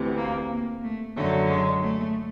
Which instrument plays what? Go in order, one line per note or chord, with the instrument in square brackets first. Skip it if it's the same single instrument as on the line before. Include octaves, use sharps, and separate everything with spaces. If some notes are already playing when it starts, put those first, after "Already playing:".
Already playing: [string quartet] D2 C3 E3
A#3
A#3
A3
F#2 D3 F#3 A3
G#3
A3